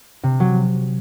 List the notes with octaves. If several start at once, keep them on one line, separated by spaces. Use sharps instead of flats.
C3
F#3